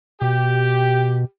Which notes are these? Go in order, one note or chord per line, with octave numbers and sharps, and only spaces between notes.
B2 G4